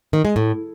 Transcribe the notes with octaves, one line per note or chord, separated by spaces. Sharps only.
D#3
G#3
A2